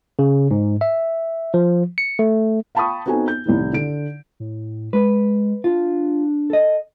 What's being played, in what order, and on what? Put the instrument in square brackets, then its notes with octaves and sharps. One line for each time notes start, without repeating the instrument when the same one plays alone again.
[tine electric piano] C#3
G#2
E5
F3
C#7
A3
[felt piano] F5 G5 A5 B5 C#6 D#6
B3 C4 D#4 F#4 A4 G#5
G6
C2 A2 D#3
D3 D7
[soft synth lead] A2
[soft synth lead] G#3 [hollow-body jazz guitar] B4
[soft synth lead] D4 [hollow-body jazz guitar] F4
[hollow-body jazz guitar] A4 D#5